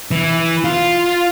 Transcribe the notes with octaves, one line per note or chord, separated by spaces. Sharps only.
E3
F4